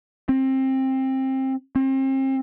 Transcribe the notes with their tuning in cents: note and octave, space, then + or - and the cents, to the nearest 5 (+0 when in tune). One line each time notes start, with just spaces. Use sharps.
C4 +20
C4 +35